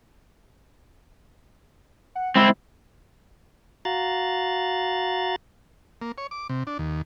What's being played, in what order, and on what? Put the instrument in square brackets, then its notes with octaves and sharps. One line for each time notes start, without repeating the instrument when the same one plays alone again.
[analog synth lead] F#5
[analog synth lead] G#3 [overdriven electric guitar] C4 E4
[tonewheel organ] F#4 F5 A#5 F#6 A6
[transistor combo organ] A#3
C#5
D6
C3
D4
D#2